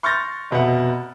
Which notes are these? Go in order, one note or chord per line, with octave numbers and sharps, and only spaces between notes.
C6 C#6 F6 G6 A6 A#6
F1 B2 E5 F#5